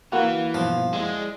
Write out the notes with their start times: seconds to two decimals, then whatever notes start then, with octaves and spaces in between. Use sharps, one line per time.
0.12 E3 A#3 F#4 F5 F#5
0.54 G2 B2 F3 F4
0.93 G#3 E4 D5